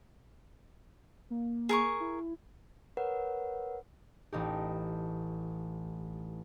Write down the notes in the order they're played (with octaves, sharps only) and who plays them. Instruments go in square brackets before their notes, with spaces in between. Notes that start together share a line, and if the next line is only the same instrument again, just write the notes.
[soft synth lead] A#3
[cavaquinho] G#4 A#4 C#6
[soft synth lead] E4
[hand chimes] A#4 B4 C#5 F#5
[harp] A1 D#4 G4